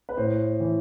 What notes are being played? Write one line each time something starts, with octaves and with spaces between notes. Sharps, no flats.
B4
A2 C5
E3